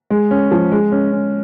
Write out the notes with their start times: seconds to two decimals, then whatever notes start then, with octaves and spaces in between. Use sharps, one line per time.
0.10 G#3
0.31 C#4
0.51 F3
0.72 G#3
0.92 C#4
1.12 C#4